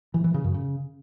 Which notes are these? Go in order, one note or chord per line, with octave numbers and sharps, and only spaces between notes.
E3
E3
C#3
F#2
C#3